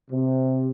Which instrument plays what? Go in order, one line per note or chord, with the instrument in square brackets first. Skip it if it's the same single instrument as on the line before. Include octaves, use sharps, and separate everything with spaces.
[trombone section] C3